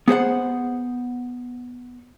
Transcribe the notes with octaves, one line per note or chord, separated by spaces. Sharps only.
B3 G#4 C5 F#5